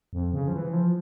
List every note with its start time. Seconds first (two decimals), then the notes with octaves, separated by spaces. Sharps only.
0.13 F2
0.33 C#3
0.48 F3
0.53 E3
0.73 F3